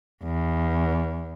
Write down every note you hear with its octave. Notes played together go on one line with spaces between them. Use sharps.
E2